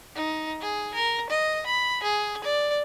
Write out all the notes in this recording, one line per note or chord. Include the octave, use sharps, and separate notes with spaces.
D#4
G#4
A#4
D#5
B5
G#4
D5